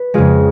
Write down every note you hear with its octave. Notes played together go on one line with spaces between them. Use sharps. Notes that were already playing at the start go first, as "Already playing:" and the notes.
Already playing: B4
F2 C#3 G#3 F4 G#4